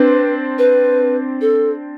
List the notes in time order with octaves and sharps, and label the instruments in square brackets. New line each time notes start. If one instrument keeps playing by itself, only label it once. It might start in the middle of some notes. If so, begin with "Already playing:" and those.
Already playing: [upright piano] C4 D4 [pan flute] B4
[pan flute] B4
A4